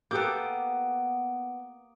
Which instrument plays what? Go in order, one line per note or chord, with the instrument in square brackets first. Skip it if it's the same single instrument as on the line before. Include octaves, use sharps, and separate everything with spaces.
[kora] A#3 G4 A4 [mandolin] B3 G6 [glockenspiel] D6 D#6 D7